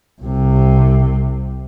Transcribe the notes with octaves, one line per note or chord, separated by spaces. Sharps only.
C2 C3